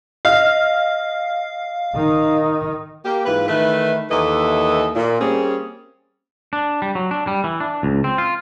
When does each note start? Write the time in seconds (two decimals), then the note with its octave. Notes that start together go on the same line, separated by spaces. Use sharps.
0.25 D#5 F5 F6
1.95 D#3 D#4
3.05 A#3 G4
3.25 G#2 E3 F4 B4
3.48 D#3 E3 A3 B4
4.10 D#2 E3 A4 D#5 E5
4.95 A#2
5.20 G3 A#3 C4 C#4 G#4
6.53 D4
6.82 G3
6.95 F#3
7.11 D4
7.27 G3
7.44 E3
7.60 D4
7.83 C#2
8.04 C4
8.18 F4